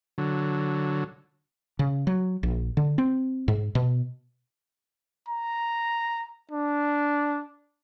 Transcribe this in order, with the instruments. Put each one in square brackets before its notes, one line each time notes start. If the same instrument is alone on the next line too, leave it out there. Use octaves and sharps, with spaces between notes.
[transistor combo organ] D3 F#3
[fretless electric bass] C#3
F#3
A#1
D3
C4
G#2
B2
[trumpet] A#5
D4